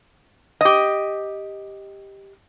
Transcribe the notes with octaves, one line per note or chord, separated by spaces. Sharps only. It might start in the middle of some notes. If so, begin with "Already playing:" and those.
G4 D#5